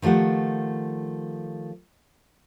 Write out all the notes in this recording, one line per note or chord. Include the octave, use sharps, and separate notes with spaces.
D#3 F3 A3 G4 F#5